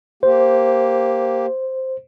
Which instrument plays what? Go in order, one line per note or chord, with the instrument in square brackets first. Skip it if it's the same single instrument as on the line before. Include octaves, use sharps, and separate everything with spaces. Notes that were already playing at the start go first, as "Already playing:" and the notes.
[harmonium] A#3 G4 [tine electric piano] C5